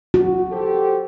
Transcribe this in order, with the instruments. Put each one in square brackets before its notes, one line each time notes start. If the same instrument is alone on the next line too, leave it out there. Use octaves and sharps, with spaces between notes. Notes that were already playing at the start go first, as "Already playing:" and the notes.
[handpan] F#4
[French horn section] G4 A4 C5